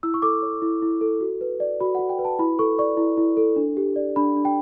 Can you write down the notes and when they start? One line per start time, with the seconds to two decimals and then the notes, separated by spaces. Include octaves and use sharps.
0.03 E4 E6
0.14 C#6
0.22 A4 D6
0.42 C#5
0.62 E4
0.82 E4
1.01 A4
1.21 F#4
1.41 B4
1.60 D5
1.81 F#4 B5
1.95 F#5
1.99 F#4
2.09 G5
2.19 B4
2.25 A5
2.39 E4 B5
2.59 A4 C#6
2.79 D5 C#6
2.97 E4
3.17 E4
3.37 A4
3.56 D4
3.77 G4
3.96 D5
4.16 D4 B5
4.36 D4
4.45 G5